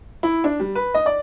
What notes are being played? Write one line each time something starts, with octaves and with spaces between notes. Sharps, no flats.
E4
D4
G3
B4
D#5
D5